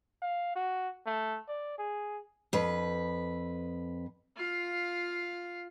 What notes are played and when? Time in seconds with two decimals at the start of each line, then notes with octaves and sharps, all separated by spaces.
0.22 F5
0.56 F#4
1.06 A3
1.48 D5
1.78 G#4
2.53 F2 B4
4.37 F4 F5